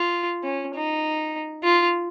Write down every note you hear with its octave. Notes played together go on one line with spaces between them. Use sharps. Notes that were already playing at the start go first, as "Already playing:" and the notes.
Already playing: F4
C#4
D#4
F4